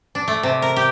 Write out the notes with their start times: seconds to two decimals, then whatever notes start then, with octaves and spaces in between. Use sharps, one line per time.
0.15 D4
0.28 A3
0.43 C3
0.62 A#4
0.76 G4